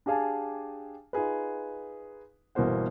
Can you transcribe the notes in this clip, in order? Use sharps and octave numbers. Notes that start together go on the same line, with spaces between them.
D4 G4 G#4 F5 G#5 A5
D#4 F4 G#4 B4
G1 B2 E3 A#3 C5 F#5